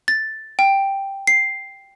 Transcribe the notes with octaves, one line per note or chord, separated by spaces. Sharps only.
A6
G5
C7